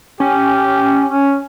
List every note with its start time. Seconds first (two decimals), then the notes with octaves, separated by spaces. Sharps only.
0.20 C#4 G4
1.06 C#4